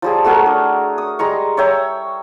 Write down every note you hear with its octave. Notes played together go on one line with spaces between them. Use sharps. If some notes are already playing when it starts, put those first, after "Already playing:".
F3 G3 G#4
A3 F#4 G#4 A#4
D4
D#6
G3 G#3 A#5 C#6
C#5 E5 G5 A#5